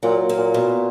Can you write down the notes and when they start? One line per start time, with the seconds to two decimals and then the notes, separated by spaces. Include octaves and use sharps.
0.03 A#2 F#3
0.29 A#3
0.37 A#2
0.54 B2